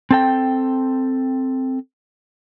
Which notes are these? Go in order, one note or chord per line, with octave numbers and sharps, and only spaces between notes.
C4 A4 G5